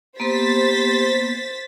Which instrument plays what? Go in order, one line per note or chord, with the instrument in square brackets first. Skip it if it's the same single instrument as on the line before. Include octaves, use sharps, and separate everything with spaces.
[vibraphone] A#3 B3 C6 [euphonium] G4 [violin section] C5 A6 B6